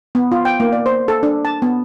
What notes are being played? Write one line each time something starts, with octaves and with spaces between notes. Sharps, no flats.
B3
F4
G5
A#3
D5
C5
A4
D4
A5
B3